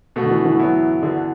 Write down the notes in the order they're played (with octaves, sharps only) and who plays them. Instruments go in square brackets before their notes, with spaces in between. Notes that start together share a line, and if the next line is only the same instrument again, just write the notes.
[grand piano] B2 A3 F#4
[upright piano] D3
E3
E3
[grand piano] F#3 B3 E4
D3 B3 D4 F#4